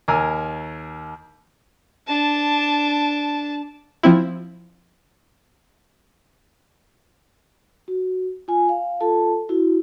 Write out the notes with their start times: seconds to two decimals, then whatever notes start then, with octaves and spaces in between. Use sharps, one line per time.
0.08 D#2 A#4 G#5 A#5 E6
2.07 D4 A5
4.03 F3 C4 E4
7.88 F#4
8.48 F4 G#5
8.69 F5
9.01 F4 A4 A5
9.49 E4 F#4